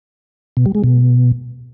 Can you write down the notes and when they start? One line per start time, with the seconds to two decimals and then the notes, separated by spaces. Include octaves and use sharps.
0.57 B2
0.66 G3
0.75 G#3
0.84 B2